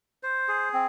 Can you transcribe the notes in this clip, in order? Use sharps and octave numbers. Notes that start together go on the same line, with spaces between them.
C5
G#4
C4